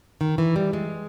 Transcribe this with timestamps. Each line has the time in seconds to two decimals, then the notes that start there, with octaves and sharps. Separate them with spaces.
0.21 D#3
0.38 E3
0.56 G3
0.73 G#3